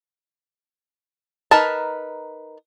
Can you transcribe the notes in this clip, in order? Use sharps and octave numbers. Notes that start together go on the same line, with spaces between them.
D#4 A#4 B4 A5